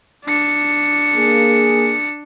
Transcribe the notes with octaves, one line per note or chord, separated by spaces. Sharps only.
D4 C#7
A#3 G#4